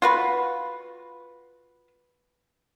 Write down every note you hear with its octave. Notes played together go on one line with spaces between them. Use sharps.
F4 F#4 B4